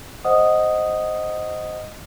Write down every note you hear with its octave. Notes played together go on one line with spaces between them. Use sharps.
C5 D#5 F#5 D#6